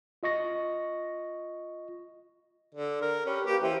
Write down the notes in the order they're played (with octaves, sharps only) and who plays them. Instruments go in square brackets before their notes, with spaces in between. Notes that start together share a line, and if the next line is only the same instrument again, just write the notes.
[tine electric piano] F4 D#5 C#6 A#6
[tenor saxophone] D3
A#4
[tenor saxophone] C#4 [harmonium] G4 B4
[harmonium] A#3 B4 G5 [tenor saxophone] G4
[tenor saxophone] E3 [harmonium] G4 C5 G5